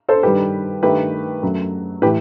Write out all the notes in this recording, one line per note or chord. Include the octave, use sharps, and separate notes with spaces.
A4 C5
G2 D#3 G3 G4 B4
G2 D#3 A3 G4 B4
F#2 F#3 A3
A2 E3 A3 G4 B4